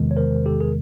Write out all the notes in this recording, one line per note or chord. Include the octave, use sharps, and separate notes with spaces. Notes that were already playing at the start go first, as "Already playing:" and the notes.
Already playing: E2 C3 D#3 G#3
C#5
A#4 C5
G4 A4
G#4 A#4